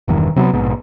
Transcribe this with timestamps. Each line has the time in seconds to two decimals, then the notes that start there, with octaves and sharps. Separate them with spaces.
0.08 E1 E2 G2 D#3
0.36 C3 F#3 G#3 B3
0.53 A#1 G#2 B2